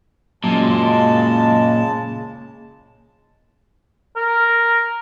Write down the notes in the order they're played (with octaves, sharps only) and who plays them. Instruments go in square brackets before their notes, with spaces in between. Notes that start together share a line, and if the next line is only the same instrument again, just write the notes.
[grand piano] F#2 [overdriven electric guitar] A#2 [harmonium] C#3 G#3 A5
[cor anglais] A#4